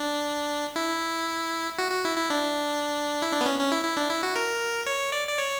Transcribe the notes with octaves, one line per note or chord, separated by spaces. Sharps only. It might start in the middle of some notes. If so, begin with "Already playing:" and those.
Already playing: D4
E4
F#4
F#4
E4
E4
D4
E4
D4
B3
C#4
C#4
E4
E4
D4
E4
F#4
A#4
C#5
D5
D5
C#5